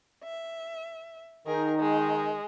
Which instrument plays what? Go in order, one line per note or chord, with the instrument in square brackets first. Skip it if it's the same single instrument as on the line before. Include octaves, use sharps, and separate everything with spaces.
[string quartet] E5
[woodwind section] D#3 D#4 [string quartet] G#4 A#4
[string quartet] G#3